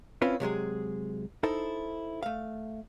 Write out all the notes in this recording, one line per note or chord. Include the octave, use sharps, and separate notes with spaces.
C4 C#4 E4 F4 B4
C3 F#3 G#3 G#4
D#4 E4 A4 C5
A3 F5